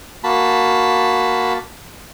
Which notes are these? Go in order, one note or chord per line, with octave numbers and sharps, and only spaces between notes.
A#3 F#4 A5 B5